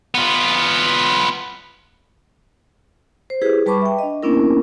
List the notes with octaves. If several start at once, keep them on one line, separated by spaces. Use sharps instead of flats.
B3 F4
C5
E4 G4 G#4 B4
G3 B4 A5 B5 C#6 D6
E5 G5
D4 D#5
A#3 B3 C#4 D4 E4 A#4